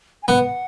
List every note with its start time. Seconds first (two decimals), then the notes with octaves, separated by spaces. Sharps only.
0.23 G#5
0.28 B3 F#5